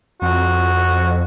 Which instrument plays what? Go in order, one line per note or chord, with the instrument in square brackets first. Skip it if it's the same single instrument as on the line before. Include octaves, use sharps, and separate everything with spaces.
[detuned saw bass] F2 [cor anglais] F#4